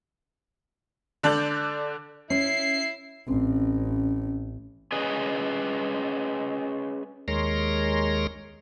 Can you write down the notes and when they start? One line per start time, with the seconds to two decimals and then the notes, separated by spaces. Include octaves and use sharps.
1.23 D3 D4 A4 D5 G6 F#7
2.30 C#4 E4 C7
3.28 A1 C4 C#4
4.92 C#4 G#4 B4 D#5 G#5
7.28 D#2 G#3 A#4 C#5 C6 A#6